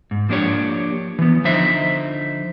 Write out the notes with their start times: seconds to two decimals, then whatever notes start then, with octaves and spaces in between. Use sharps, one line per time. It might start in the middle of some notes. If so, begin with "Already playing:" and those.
0.11 G#2
0.29 F3 A#3 D4 G4 C#5
1.19 E3 B3
1.44 D3 F3 D#4 C5 E5